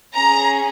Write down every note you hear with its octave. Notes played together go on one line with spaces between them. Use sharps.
C#4 G#4 A#5